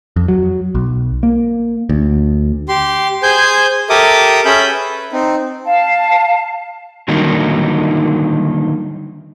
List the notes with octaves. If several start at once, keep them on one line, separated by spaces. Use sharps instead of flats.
F2
F#3
B1
A#3
D2
G4 C6
G#4 C5 G#5 G6
G4 A4 A#4 E5 D6 D#6
C#4 G#4 A4 E5 B5 G6
B4
C4 D#4
F5 A5
D3 D#3 F#3 G3 A#3 D#4